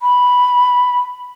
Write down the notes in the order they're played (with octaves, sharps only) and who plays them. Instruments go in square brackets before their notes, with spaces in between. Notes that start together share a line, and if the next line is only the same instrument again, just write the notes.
[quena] B5